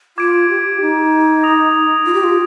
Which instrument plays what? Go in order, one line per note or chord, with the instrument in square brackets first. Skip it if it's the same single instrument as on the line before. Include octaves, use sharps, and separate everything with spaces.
[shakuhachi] F4 [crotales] D6 G#6 D7
[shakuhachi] G4
D#4
[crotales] D#6 A#6 F7
[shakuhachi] F4
G4
F4